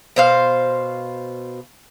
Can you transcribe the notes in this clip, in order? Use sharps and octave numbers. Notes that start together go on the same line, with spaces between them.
B2 C5 F5